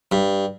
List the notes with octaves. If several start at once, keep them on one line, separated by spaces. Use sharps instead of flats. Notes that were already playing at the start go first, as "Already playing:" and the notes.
G2